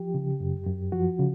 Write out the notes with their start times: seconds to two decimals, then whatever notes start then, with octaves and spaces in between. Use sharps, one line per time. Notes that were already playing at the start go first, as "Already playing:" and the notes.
Already playing: F3 G4
0.14 C#3
0.40 F#2
0.67 F#2
0.92 F3 F#4
1.19 C#3